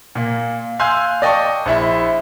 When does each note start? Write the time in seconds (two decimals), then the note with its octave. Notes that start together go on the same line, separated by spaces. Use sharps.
0.15 A#2 A#3
0.79 F5 G#5 C6 E6 F#6 G6
1.22 D5 D#5 G5 A5 C#6
1.66 A#1 E4 E5